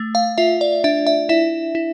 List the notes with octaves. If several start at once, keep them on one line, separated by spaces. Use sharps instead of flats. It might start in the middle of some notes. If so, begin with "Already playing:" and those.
Already playing: A3
F5
F4 E5
D5
D4 E5
E5
E4 E5
E4